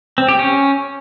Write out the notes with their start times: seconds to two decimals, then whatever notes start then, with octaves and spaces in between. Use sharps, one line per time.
0.18 C4
0.29 G4
0.39 C#4